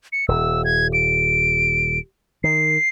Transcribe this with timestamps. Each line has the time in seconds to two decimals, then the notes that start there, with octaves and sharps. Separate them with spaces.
0.12 C#7
0.28 D#1 E6
0.65 G#6
0.93 D7
2.44 D#3 C7